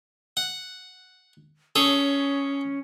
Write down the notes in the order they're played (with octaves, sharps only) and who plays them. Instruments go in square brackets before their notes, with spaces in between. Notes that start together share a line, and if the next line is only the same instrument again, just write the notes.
[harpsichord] F#5
[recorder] C#4 [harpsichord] G#4 A4 C#5